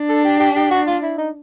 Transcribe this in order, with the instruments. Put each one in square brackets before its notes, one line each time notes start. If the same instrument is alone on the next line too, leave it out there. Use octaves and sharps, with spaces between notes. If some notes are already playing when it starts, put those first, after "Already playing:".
Already playing: [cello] D4
[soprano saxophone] A4
G4
G4
G4
F#4
F4
E4
D#4